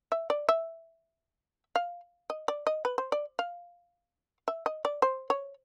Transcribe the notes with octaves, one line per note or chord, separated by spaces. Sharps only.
E5
D5
E5
F5
D#5
D5
D#5
B4
C5
D5
F5
E5
D#5
D5
C5
C#5